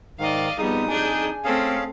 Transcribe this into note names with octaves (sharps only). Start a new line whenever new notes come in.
G#2 D#3 D5 D#5 F5
F2 F3 G3 B3 D#4 G#4 D#6
D4 G#4 G#5 G6
A3 C4 C#4 G#4 A4 F5